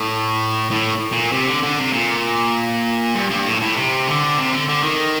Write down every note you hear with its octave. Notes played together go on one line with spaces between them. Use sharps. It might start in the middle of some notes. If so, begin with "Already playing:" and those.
Already playing: A2
A2
A#2
C3
D3
D3
C3
A#2
G2
G2
A2
A2
C3
D3
C3
D3
D3
D#3